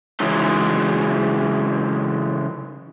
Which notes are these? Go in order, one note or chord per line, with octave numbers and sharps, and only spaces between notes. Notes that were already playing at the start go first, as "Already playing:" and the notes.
C#3 E3 F#3 G#3 D#4